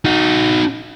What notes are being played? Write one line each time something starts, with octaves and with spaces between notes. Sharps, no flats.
D#4 F#4